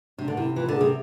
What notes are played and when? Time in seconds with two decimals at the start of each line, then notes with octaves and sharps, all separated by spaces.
0.18 C3 D4
0.28 D3
0.37 C3 E4
0.56 E3 F4
0.68 D3
0.74 G#4
0.81 C3